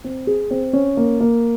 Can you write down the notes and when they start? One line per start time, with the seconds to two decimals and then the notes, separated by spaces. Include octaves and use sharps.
0.04 C4
0.27 G#4
0.51 C4
0.73 C#4
0.97 A#3
1.20 A#3